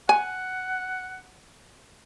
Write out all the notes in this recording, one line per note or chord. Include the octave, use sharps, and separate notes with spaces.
F#5 G#5